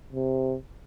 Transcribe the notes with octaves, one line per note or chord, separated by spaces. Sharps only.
C3